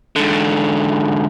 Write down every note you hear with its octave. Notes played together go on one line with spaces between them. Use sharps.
G#2 D3